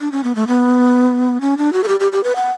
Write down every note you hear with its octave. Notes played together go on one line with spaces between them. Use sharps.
D4
C#4
B3
A3
B3
C#4
D4
F#4
A4
G4
G4
G4
B4
F#5